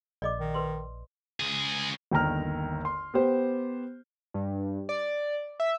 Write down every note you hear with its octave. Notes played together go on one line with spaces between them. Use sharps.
A#1 D5 D#5 D6
D#3
B4 C6
C#2 G#4
G1 D#2 D#3 A#4 A#5 F6
C6
B3 G4 C5
G2
D5
E5